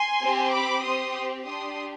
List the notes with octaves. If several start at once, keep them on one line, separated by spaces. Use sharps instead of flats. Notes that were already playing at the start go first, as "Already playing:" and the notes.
Already playing: G#5 C6
C4 G4
B5 D6
C4 G4 C6 D#6
D4 G4 C6 D#6